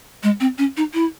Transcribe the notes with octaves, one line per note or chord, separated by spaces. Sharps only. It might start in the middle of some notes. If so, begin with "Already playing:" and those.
G#3
C4
C#4
D#4
E4